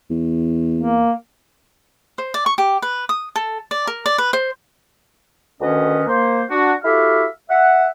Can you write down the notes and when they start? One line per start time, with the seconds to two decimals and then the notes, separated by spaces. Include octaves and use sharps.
0.10 E2
0.78 A#3
2.18 C5
2.34 D5
2.46 C#6
2.58 G4
2.82 B4
3.09 D#6
3.36 A4
3.71 D5
3.87 A#4
4.06 D5
4.18 B4
4.33 C5
5.61 D2 D#3 C#4 B4 D#5
6.07 A#3 C5
6.50 D4 F#4
6.84 E4 F#4 G4 A4 E5 F5
7.50 E5 F#5